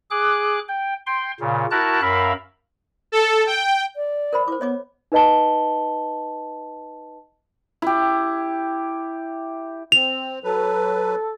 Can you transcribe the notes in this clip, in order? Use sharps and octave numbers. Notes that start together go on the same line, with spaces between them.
G#4 D6 F#6
G5
G5 C6
A#2 C#3
E4 F#4 A#4 A5 F#6
F#2 A#4 E5 F5 B5
A4
G5
D5
A#4 C5 B5
E4 C5 D6
B3 C#5 D#5 D6
D#4 B4 D#5 A5 G7
E4 G4
C4 F7
F#3 A4 B4